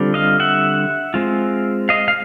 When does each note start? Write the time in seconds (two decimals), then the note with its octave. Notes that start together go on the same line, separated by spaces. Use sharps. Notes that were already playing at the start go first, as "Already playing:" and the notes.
Already playing: D3 G3 C4 F4
0.14 D#5 F5
0.40 E5 F#5
1.14 G#3 C4 F4
1.89 D#5 F5
2.08 F5